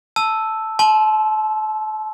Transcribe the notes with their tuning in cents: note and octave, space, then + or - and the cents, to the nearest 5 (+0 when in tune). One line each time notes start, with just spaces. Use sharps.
A5 +0 E6 +0
A5 -35 C6 -5